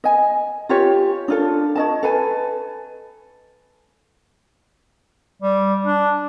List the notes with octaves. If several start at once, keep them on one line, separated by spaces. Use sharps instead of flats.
D#5 G#5
F4 G4 C#5
D4 F4 A4
C#5 D#5 A5
A4 B4 G#5
G3
D4